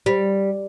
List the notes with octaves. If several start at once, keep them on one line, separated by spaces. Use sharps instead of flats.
G3